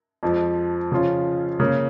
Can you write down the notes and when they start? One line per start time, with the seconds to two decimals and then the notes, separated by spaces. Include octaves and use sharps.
0.23 F2 F3 G#3
0.92 C#3 F3 C#4 F4
1.60 C#3 A#3 C#4